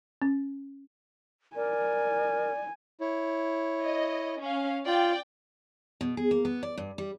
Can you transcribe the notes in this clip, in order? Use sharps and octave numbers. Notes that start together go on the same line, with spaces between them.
C#4
A#4 D5 G#5
E4 C#5
D#5
C#4 F5
F4 D5 G5
B2
G#4
A#3
B3
D5
G2
G3